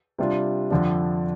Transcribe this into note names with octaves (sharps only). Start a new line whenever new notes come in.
C3 G3 D4 F4
F2 D3 F3 D4